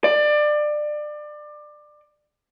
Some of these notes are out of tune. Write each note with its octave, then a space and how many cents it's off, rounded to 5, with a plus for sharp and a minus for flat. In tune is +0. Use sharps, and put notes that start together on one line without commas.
D5 +25